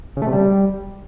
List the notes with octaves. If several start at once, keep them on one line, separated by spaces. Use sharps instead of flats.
C#3
A3
C3
G3